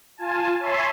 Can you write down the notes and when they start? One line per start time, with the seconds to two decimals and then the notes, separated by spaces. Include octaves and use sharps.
0.18 F4 G#5 A5
0.60 C#5 E5 G#5 A5 B5 C6